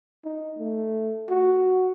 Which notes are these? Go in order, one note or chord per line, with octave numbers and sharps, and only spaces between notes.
D#4
A3
F#4